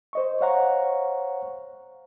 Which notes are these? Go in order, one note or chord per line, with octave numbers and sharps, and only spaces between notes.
C5 D#5 C#6
C5 C#5 F5 F#5 A#5 C#6